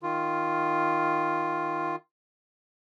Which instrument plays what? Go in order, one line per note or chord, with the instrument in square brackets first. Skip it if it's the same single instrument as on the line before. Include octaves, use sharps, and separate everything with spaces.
[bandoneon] D#3 F4